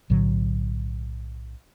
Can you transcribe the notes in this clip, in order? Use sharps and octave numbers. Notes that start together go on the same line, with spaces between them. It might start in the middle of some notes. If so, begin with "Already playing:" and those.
B1 A2 D3 F#3